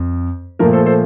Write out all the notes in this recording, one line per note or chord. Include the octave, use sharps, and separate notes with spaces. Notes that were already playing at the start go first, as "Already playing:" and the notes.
Already playing: F2
A#2 F3 A3 A#4
A4 C5
A4 C5